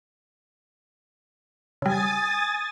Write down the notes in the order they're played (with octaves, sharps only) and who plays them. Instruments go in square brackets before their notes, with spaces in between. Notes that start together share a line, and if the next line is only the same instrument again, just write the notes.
[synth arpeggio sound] C#3 G3 [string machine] G#5 D#6 A6